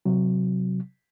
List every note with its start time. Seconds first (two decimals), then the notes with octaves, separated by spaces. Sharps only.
0.05 C3 F#3